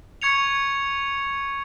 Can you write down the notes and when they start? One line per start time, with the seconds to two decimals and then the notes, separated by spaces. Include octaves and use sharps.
0.22 C#6 G#6 C#7 F7